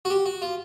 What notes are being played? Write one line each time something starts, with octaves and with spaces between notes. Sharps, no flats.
F#4
G4
F#4
F4